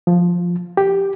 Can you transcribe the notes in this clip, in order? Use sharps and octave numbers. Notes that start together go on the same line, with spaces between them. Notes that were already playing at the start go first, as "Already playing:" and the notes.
F3
G4